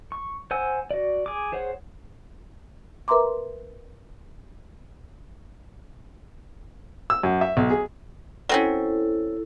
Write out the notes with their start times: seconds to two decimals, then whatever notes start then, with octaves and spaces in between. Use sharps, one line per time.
0.12 C#6
0.51 C5 F#5 G#5 E6
0.91 F#4 D5
1.26 G#4 D6
1.52 G#4 C5 C#5 F#5
3.08 A#4 B4 E5 A#5 C6 D6
7.10 E6
7.23 F#2
7.41 E5
7.57 B1
7.71 G#4
8.49 F#3 C4 C#4 E4 A4